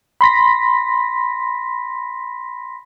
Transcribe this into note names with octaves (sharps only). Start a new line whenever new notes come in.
B5 C6 A#6 B6